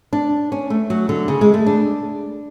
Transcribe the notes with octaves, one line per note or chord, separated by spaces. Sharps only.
D4
C#4
A3
F#3
D3
C#3
G#3
A3
D4